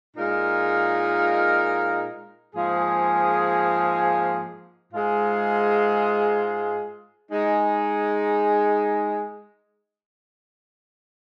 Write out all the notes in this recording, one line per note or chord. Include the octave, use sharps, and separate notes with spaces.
A#2 G#3 D#4 A#4 F5
G#2 F3 A#3 G#4
G#2 G#3 F4 G#4
G#3 D#4 G#4